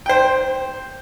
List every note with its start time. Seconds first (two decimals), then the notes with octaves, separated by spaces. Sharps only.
0.06 C5 G5